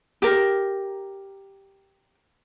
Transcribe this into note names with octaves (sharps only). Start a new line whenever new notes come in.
G4 A#4